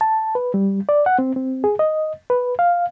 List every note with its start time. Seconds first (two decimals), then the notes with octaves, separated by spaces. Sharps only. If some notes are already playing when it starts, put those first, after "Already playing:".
0.01 A5
0.35 B4
0.54 G3
0.89 D5
1.06 F#5
1.19 C4
1.36 C4
1.64 G#4
1.79 D#5
2.30 B4
2.59 F5